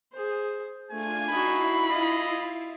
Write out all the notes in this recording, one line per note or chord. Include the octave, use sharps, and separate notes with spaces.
G#4 C5
A3 D4 F4 G#5 G#6
D#4 E4 F#4 B5 C7
F4 D#5